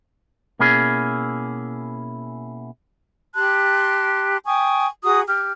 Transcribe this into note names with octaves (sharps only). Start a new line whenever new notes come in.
B2 A#3 C#4 E4 G#4
G4 A5 C6 F#6
G5 G#5 C#6 D#6
F#4 G#4 A#5 D#6
G4 F6